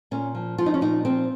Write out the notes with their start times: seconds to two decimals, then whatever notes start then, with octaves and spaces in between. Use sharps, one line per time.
0.11 A#2 C#4
0.35 F3
0.58 F3 F4
0.66 D#4
0.74 C#4
0.81 A#2 D#4
1.05 F3 C4